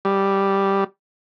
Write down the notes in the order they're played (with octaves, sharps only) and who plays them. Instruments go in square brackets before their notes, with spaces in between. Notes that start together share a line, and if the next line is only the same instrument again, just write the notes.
[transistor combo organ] G3